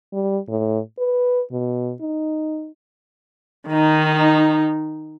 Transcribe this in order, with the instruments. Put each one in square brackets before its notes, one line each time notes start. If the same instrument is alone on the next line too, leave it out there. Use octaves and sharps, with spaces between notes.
[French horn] G3
A2
B4
B2
D#4
[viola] D#3 D#4